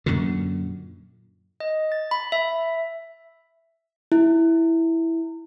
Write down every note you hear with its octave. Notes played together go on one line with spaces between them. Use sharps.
F#2 A#2 D3
D#5
A6
B5
E5
E4